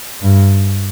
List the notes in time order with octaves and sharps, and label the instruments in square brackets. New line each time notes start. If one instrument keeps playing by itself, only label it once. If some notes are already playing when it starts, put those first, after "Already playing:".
[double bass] G2